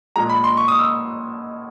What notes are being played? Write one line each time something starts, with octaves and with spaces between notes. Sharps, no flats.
A#2 F3 G#3 A#5
B5
C6
C#6
D#6
E6